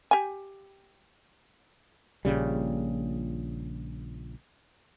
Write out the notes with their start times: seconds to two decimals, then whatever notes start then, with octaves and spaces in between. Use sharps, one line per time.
0.11 G4 G#5
2.25 A#1 A#2 C#3 G3